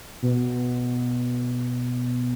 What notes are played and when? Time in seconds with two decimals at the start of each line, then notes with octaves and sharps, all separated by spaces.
0.22 B2